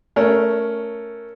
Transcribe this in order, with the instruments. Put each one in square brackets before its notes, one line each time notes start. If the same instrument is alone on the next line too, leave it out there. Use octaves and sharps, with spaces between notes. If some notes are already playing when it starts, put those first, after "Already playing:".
[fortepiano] A3 C#4 A#4